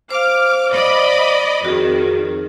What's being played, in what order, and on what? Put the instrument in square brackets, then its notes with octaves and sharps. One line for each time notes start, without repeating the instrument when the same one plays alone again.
[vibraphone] C5 F5 [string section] D6 F6
[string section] D5 D#5 B5
[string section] F2 D#3 [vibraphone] F#4 G#4